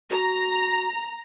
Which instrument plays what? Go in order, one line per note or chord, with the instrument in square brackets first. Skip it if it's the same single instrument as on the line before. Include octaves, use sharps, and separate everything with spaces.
[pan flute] F#4 [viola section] A#5